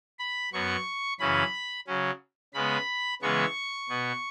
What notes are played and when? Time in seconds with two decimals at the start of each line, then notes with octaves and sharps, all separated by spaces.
0.19 B5
0.53 F#2 F#3 B3 C#6
1.19 F#2 C#3 E3 C#4 B5
1.87 C#3 F#3 C#4
2.54 C#3 G#3 B3 B5
3.22 C#3 E3 G#3 B3 C#6
3.89 B2 B3